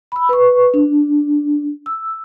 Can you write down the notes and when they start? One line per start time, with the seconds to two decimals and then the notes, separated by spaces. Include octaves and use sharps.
0.12 B5 E6
0.29 B4 C#6
0.74 D4
1.86 E6